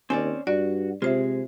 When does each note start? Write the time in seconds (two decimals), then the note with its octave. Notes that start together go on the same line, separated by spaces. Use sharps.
0.10 D#2 C4 C#4 D5 G#5
0.47 G2 F#4 D5
1.02 C3 G#3 F4 C5 E5